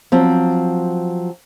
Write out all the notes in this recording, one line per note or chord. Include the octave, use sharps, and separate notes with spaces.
F3 F#3 C4